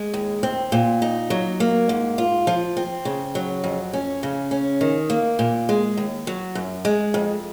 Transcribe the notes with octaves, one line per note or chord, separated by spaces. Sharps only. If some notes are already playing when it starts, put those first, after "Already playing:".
Already playing: G#3
D#2
C4
A#2
D#4
F#3
A#3
G#2
F4
F3
C4
C#3
F#3
F2
C#4
C#3
C#4
D#3
A#3
A#2
G#3
D#2
F#3
F#2
G#3
F2